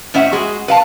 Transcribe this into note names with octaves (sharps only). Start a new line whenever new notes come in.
A2 C#4 C5 E5 F#5
G#3 F#4 G#4
B4 F5 A5